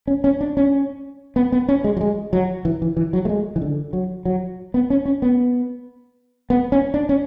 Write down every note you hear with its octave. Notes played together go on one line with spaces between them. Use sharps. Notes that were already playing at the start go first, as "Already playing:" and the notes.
C#4
C#4
D4
C#4
B3
B3
C#4
G#3
F#3
G#3
F#3
E3
E3
E3
F#3
A3
G#3
E3
D3
F#3
F#3
B3
C#4
C#4
B3
B3
C#4
D4
C#4